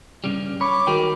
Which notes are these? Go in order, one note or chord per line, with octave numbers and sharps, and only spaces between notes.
G2 C#3 G3
C#5 B5 D6
D#3 G#3 D#4 F#4 A#4 G5